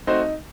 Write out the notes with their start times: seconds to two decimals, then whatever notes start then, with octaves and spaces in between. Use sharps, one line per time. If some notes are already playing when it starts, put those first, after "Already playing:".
0.07 A3 C4 D#4 F#4 C5